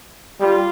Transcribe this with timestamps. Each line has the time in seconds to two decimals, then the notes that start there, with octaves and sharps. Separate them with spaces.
0.40 G3 F4